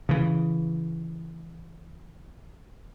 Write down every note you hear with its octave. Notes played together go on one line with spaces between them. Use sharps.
C#3 E3